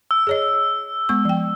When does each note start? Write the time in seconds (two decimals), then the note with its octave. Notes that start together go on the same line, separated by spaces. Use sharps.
0.11 E6
0.27 G#4 C#5 D#5
1.09 G#3 B3 C#6
1.25 F3 G5